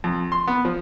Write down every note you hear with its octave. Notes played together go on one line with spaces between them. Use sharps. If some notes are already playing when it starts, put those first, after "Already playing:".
F2
C6
B3
F3